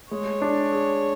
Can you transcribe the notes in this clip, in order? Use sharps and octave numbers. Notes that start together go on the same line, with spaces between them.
G#3 C#5
D4
G#4